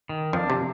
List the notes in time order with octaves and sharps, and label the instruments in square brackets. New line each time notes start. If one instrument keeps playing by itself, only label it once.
[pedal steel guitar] D#3
[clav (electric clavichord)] F2 F3 [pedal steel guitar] D4
[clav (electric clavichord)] C3